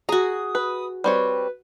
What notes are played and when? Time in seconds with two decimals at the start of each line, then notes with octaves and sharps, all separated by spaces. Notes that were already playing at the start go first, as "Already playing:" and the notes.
0.09 F#4 G#4 A#5 D#6
0.55 B4
1.04 G3 C4 B4 C#5